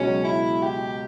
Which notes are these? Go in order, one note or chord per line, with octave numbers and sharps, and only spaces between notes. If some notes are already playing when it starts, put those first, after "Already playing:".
Already playing: C#2 B2 F#3 C#4
E4
G4